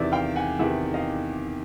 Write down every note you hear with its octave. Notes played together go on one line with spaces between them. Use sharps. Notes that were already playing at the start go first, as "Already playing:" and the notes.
Already playing: E2 C3 D#3 D5 E5
F5 G5
F#5 G#5
E2 C3 D#3 E5 F#5
D#5 F5